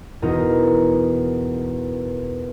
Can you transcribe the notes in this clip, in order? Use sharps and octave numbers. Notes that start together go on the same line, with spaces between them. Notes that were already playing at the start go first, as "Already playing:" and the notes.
E2 B2 D#4 A#4